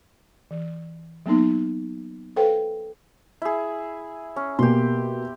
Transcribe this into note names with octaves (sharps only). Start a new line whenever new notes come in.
E3
F#3 A#3 B3 D#4
A4 B4 C5 F5 G5
E4 G#4
C#4
B2 A#3 G4 C6